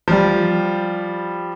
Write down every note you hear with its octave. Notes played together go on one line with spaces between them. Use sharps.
F3 G3